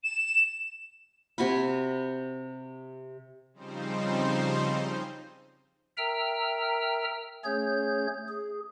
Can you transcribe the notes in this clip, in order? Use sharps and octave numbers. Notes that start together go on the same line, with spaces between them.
E7
C3 F#4 G#5 B5
C#3 F3 G3 C4 D#4 C5
A#4 E5 G5 A#5 E6 F6
A3 C#4 G#4 C#5 G6
G#4